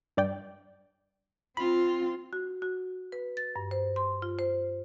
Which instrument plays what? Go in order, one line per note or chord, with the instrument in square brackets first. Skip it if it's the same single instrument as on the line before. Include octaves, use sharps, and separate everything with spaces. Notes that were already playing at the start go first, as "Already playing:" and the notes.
[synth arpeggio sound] G2 D5 G5
[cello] C4 F4 [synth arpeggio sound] B5
[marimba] F#4
F#4
B4
A6
G2
C5
C6
F4
C5